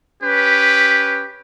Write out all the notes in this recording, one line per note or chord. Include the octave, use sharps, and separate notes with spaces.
C#4 G4 B4